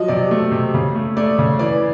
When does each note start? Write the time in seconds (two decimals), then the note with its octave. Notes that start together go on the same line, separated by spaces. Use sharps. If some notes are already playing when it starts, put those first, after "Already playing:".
Already playing: F3 F#3 D#5
0.08 C3 D5
0.31 A3
0.52 C3
0.74 C#3
0.95 A3
1.17 A3 D5
1.39 C#3
1.59 E3 D5